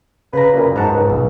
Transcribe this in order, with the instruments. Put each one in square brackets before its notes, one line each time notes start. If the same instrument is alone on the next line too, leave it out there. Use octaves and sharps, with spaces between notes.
[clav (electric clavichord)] C#3 A#5 [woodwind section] B4
[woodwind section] F#2 A#2
[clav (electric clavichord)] G#2 F#5 [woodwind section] C5 A5 A#5
[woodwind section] C#2
[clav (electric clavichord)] B1